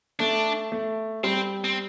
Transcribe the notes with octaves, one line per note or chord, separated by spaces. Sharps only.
A3 D4
A3
G3 C4
C4